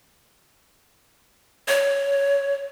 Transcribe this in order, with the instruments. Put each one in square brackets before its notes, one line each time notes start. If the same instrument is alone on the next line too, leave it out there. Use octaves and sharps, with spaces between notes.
[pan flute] C#5